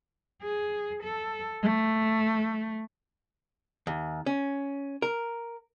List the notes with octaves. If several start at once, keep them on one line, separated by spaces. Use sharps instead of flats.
G#4
A4
A3
D#2
C#4
A#4